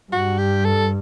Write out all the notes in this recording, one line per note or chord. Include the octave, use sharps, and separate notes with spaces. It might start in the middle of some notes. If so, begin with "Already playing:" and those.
G2 F#4
G4
A4